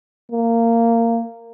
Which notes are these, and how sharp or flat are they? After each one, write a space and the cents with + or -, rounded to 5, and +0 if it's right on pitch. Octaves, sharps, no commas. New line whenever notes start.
A#3 -15